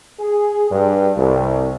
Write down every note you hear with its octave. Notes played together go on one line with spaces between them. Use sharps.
G#4
G2
C2